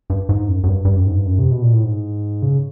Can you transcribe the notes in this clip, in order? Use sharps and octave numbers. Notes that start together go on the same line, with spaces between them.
G2
G#2
F#2
F#2
G2
G2
F#2
G#2
G2
F#2
C3
B2
A#2
A2
G#2
C#3